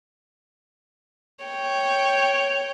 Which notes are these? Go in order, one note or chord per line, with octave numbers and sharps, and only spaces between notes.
C#5 G5